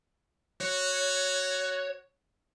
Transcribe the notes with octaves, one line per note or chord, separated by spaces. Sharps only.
F#4 C#5